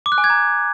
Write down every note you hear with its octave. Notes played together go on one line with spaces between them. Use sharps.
D6
F#6
G#5
G#6
A#5